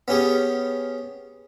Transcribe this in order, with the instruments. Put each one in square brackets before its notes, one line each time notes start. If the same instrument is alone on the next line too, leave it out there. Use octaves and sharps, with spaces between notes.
[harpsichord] B3 C#4 G4 G#4